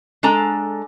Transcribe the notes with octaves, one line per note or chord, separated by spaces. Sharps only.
G#3 D4 A4 A#5